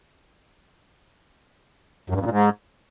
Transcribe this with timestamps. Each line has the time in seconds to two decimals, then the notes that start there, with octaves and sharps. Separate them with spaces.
2.10 F#2
2.15 G2
2.20 F2
2.25 A#2
2.31 G#2